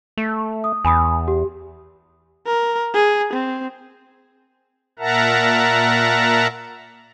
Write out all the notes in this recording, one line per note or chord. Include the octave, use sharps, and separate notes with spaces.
A3
D#6
E2 G#5 B5 D#6
G4
A#4
G#4
C4
A#2 A#4 E5 F#5 A5 A#5